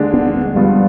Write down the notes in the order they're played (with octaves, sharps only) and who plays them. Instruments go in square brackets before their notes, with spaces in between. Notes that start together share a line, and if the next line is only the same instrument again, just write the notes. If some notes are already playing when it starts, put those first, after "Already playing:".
Already playing: [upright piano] D#2 D3 G#3 D4
[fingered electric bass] B3
B3
G#3
[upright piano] G2 F3 B3 F4 [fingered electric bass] G3